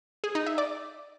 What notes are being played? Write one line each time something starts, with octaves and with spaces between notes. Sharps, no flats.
G#4
D#4
E5
D5